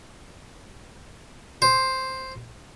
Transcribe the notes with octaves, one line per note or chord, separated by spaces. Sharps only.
C5